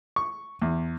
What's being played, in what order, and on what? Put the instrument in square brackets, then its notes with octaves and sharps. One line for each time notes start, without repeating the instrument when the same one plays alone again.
[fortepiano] C#6
E2